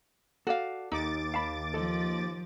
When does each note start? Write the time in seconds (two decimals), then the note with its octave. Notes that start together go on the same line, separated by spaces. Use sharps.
0.47 F#4 A4 D5 F5
0.92 D#2 D#4 D6 A6
1.34 F5 A5 B5
1.74 F3 A4 D#5